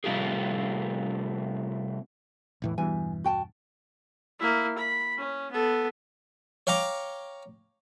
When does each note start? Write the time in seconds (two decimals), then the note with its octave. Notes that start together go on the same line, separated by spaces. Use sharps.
0.04 C3 G3 A3 F4 G4 G#4
2.62 E1 A2 E3
2.78 E2 G2 B2 E3 G#5
3.24 F#4 G5 A5
4.39 A#3 E4
4.77 B5
5.18 C#4
5.51 B3 A4
6.67 C#5 F5 G5 A#5 D6